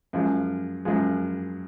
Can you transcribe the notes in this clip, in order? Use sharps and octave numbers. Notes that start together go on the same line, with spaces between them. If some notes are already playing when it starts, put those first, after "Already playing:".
F#2 F3 G#3
F#2 F3 G#3